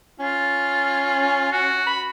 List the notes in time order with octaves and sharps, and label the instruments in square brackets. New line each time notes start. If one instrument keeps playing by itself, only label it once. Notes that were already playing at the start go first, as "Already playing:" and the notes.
[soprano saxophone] C#4 [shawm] F4
[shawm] F#4
[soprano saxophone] B5